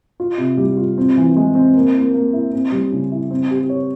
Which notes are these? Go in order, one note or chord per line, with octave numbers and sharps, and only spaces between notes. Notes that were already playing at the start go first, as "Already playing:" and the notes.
F4
C3
G3
F4
C4
E3
G#3
C4
A#3
A#3
A#3
E4
C4
G3
C#3
E4
C4
G4
C#5